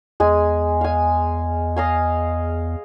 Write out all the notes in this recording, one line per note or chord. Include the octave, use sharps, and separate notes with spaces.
E2 G#3 G#5
F5 G#5
D#5 F5 G#5